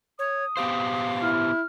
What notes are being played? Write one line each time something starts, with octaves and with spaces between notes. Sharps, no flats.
C#5 D#6
B3 G4 C5 F5
E4 F6